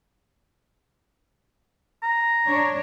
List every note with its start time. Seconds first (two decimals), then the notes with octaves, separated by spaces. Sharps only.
2.03 A#5
2.47 D4 C#5